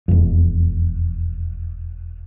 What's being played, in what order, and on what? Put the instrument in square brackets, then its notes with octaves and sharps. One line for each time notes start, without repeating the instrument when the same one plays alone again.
[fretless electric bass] E1 F2